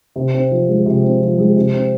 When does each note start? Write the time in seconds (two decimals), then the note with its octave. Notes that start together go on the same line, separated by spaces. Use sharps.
0.16 C3
0.34 C4
0.51 F3
0.69 G#3
0.86 C3
1.03 C4
1.21 F3
1.39 G#3
1.56 C3
1.74 C4